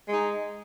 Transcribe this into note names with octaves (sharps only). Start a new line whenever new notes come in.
G#3 D#4 G#4